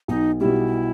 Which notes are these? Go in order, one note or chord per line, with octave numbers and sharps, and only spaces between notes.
B1 D#4
B2 G3 E4